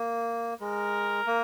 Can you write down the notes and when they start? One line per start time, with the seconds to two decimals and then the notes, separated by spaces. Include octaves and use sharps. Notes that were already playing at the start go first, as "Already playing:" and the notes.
Already playing: A#3
0.60 G#3 A#4
1.27 A#3